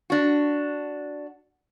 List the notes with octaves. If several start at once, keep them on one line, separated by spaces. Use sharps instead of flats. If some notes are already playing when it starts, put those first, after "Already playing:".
D4 F#4